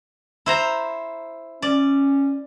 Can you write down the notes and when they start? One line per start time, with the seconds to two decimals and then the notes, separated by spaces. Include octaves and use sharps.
0.46 E4 C5 A#5
1.62 C#4 D5